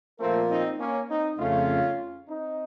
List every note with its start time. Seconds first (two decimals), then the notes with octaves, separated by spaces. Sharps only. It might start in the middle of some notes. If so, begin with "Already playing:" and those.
0.20 A#2 F3 A3 A#3 C4 F4 A#4
0.50 C4 D#4
0.79 A#3 C#4
1.09 C4 D#4
1.38 F2 C#3 A3 C#4 F4
2.28 C4 D#4